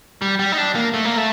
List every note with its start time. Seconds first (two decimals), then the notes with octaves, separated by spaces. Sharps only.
0.22 G3
0.39 G3
0.52 D#4
0.58 D4
0.75 A#3
0.94 A3
1.05 A#3
1.17 A3